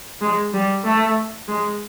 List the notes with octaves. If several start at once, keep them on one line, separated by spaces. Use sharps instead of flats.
G#3
G3
A3
G#3